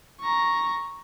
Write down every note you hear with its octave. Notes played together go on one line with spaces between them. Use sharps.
A#5 C#6